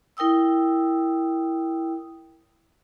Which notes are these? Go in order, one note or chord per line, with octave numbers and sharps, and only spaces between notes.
E4 A#4 G5 D#6 E6